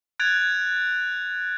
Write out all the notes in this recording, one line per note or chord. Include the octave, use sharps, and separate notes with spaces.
F#6 G#6 A6 D7 F7